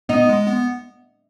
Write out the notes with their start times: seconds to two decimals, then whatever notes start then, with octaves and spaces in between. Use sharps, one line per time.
0.09 B3 D#4
0.29 G#3
0.47 B3